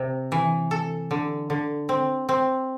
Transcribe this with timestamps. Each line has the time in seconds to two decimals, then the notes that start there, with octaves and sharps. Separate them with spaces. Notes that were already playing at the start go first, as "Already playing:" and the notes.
Already playing: C3
0.32 E3
0.71 A4
1.11 D3
1.50 D3
1.89 C4
2.29 C4